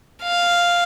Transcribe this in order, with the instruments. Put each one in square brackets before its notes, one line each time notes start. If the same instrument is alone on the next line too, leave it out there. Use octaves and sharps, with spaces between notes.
[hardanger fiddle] F5